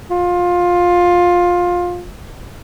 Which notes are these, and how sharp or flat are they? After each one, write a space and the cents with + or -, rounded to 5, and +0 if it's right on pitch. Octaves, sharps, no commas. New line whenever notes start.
F4 +15